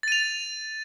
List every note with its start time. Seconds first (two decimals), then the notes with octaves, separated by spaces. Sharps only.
0.03 A6
0.08 D#7
0.12 F7